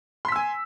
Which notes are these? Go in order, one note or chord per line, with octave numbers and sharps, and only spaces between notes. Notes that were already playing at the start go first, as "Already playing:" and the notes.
G#5 C6 E6 B6